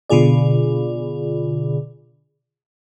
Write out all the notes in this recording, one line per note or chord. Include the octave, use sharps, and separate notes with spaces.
B2 D3 F4 G#4 D5